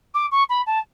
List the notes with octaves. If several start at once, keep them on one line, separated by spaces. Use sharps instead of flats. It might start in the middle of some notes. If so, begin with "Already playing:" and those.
D6
C#6
B5
A5